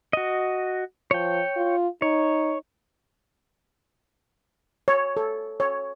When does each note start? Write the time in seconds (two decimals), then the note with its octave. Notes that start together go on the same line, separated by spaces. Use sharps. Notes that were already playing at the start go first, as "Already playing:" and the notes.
0.13 F#4 D#5
1.11 F3 C#5 G5
1.56 F4
2.02 D#4 C#5
4.88 C#5
5.17 A4
5.60 C#5